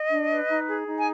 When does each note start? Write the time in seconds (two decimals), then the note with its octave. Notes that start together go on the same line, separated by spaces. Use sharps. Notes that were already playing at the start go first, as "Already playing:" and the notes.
Already playing: D#5
0.11 D4
0.30 B4
0.49 D#4
0.68 G#4
0.87 D#4
0.98 G#5